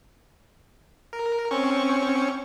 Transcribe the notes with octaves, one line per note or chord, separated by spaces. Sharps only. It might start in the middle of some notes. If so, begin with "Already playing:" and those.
A#4
C4 C#4 C#6